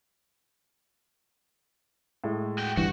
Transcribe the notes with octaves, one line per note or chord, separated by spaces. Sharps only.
A2 G#3
F#4 G5
G1 G2 E3 F#4